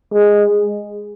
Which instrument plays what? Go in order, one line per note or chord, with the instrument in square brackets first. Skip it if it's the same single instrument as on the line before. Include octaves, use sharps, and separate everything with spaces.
[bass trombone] G#3